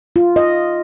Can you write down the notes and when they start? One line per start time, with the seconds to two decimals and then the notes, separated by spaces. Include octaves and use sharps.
0.16 F4
0.36 D#5